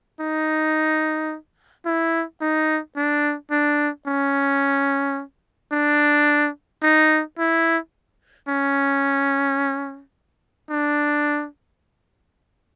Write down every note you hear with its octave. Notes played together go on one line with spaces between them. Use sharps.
D#4
E4
D#4
D4
D4
C#4
D4
D#4
E4
C#4
D4